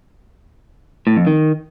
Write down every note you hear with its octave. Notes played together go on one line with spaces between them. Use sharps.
A2
F2
D#3